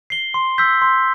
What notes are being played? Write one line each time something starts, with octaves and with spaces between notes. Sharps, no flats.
C7 G7
C6
E6 G6 B6
C6